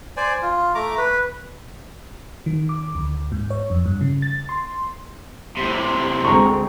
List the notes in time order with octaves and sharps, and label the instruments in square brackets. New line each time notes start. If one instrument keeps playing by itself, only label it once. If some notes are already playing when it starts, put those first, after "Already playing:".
[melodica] C5 D5 G#5
F4
A3 A#5 D6
B4
[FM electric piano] D#3
D6
D2
G#2
C#5
F2
G2
C#3
A6
C6
[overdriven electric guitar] A2 C3
[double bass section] D2 G#3 C4 [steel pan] A#5 C#6